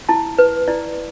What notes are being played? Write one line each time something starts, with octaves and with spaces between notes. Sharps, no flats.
E4 A5
B4
E4 D5